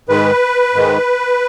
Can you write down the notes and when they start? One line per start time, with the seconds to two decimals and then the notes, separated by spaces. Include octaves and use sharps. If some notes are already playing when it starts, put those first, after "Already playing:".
0.09 G#2 D#3 G#3 B4
0.75 G#2 D#3 G#3